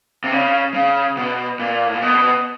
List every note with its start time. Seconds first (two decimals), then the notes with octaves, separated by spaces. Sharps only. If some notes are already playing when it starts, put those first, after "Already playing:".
0.24 C3
0.32 C#3
0.74 C#3
1.17 B2
1.59 A#2
1.87 A2
1.94 A#2
2.02 B2